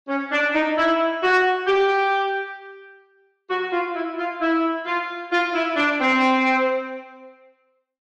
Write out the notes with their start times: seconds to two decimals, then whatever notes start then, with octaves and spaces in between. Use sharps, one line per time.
0.08 C#4
0.31 D4
0.54 D#4
0.77 E4
1.22 F#4
1.67 G4
3.49 F#4
3.71 F4
3.94 E4
4.18 F4
4.41 E4
4.86 F4
5.31 F4
5.54 E4
5.76 D4
5.99 C4